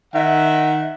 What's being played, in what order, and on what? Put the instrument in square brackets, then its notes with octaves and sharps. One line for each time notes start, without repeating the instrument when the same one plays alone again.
[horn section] D#3 E5 F#5